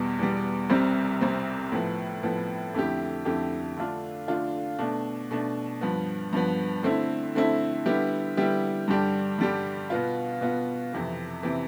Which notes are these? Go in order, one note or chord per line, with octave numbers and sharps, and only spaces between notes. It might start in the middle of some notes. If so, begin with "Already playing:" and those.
Already playing: E2 B2 G3
E2 B2 G3
C2 C3 G3 C4
C2 C3 G3 C4
A2 F3 B3
A2 F3 B3
F2 D3 A3 E4 G4
F2 D3 A3 E4 G4
D3 A3 D4 F4
D3 A3 D4 F4
B2 A3 D4
B2 A3 D4
G2 F3 B3
G2 F3 B3
D3 A3 C4 E4
D3 A3 C4 E4
D3 G3 B3 E4 G4
D3 G3 B3 E4 G4
G2 D3 G3 D4 G4
G2 D3 G3 D4 G4
B2 B3 F4
B2 B3 F4
F2 C3 E3
C3 E3